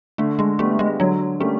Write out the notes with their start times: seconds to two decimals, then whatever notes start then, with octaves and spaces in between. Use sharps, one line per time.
0.18 D3 A3
0.39 G#3
0.59 G3 A3 B3
0.79 G#3
0.99 D3 F#3
1.40 G3 A3 A#3 C#4